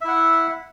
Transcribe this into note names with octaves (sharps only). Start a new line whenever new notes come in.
E4 E5 F#5